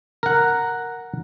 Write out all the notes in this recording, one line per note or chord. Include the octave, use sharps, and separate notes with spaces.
A#4 F#5